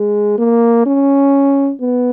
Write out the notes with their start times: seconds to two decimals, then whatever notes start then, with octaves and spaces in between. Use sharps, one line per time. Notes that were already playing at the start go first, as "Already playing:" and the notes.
Already playing: G#3
0.38 A#3
0.86 C#4
1.80 B3